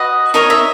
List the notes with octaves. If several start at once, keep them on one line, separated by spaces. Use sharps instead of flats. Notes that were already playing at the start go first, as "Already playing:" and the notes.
Already playing: F#4 B4 D#5
D#4 A#4 C#5 D#5
E5